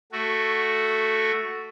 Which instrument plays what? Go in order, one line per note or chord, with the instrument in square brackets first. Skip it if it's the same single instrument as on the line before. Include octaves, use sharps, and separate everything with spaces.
[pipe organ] A3 F#4